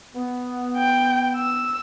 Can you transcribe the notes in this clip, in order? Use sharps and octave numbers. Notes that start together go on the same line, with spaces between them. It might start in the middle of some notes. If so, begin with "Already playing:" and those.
B3
G5
E6